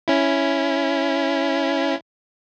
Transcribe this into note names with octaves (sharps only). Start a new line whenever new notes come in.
C#4 E4